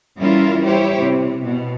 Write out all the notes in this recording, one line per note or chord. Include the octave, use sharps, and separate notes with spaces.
E3 G3 C#4 E4 F4 A#4
E4 G4 C5 C#5
C3
B2